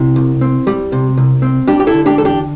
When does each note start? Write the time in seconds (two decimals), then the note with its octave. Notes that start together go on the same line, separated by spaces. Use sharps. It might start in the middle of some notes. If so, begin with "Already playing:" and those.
Already playing: C3 E4
0.16 C2
0.41 C4
0.67 G3
0.92 C3
1.17 C2
1.42 C4
1.68 G3 D4 G4
1.80 G4
1.87 E4 A4
1.94 D3
2.06 D4 G4
2.18 E2 A4
2.25 D4 G4